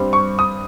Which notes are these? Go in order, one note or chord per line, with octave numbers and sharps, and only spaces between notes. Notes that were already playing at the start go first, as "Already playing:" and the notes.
Already playing: G2 G3 C4
C#6
D#6